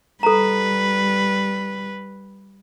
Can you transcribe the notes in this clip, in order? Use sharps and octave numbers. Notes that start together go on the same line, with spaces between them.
G3 A4 B4 A#5